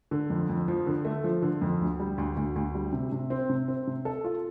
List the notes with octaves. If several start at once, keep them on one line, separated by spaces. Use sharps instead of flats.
D3
F2
F2
F3
D3
A3
F3
D3
F2
D2
G3
D2
D2
D2
G3
C3
C3
C4
C3
C4
C3
A4
F4